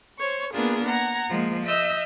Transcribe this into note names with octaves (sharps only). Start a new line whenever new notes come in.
C5 C#5 C#6
A#3 B3 D4 F4 G#4 A#4
F#5 A#5 G#6
F3 G#3 A#3
D#5 E5 E6 F6 G6